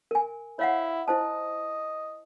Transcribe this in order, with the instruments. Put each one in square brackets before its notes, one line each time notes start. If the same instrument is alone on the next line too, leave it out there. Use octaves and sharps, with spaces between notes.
[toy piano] A#4 G#5
[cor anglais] E4 [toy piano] C#5 F5 F#5
[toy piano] E4 C5 A5 [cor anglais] D#5